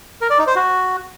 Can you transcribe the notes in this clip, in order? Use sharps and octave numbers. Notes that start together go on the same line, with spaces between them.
A#4
D5
D#4
C5
F#4